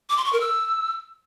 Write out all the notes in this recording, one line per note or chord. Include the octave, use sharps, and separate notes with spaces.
D6
C6
C#6
A#4
E6